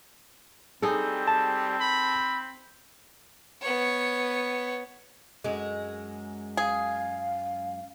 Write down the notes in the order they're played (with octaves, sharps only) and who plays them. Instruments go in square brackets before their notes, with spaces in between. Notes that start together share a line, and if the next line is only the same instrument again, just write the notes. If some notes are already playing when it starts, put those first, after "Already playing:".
[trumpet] G3 [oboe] C4 [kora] D#4 G#4 A4
[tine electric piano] A5
[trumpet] B5
[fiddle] B3 C#5
[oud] F#2 G#3
[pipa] G#4 [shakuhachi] F5